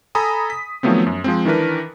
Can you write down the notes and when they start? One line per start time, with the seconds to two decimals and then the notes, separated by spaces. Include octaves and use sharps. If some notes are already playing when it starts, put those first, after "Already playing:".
0.15 A4 G#5 A#5 B5 D#6
0.50 B6
0.83 D#3 F3 F#3 A3 B3 C4
1.07 F#2
1.24 F3 G#3 C4
1.45 D#3 E3 D4 A#4 B4